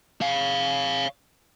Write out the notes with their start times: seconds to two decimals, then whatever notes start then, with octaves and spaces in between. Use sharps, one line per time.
0.21 C#5 F5